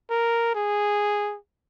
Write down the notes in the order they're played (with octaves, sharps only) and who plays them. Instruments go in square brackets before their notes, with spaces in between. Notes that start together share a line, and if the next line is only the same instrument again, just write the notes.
[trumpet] A#4
G#4